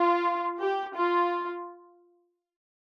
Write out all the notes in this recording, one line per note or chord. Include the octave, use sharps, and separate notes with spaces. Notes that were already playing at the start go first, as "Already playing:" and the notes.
Already playing: F4
G4
F4